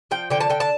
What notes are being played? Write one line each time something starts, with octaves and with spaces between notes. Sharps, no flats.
F3 G5
D3 G5
A5
D3 G5
A5